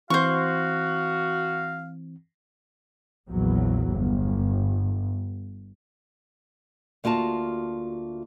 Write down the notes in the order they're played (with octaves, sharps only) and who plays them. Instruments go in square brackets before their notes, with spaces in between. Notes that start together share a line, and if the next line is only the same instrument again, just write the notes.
[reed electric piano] E3 C4 [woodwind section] F#4 [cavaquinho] C5 C#6 [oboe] F5
[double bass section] A#1 E2 F#3
G1
[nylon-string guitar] D2 A#3 F4 F#4 A5